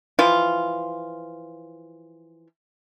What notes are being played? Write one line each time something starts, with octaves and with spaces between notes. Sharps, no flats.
E3 F3 F4